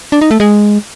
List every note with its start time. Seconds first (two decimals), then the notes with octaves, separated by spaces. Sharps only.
0.12 D4
0.21 D#4
0.31 A3
0.40 G#3